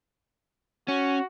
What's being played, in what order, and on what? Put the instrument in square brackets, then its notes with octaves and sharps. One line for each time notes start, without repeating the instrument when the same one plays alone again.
[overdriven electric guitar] C#4 [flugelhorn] F#4